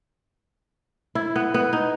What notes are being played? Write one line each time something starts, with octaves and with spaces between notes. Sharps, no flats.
E4
B3
B3
D#4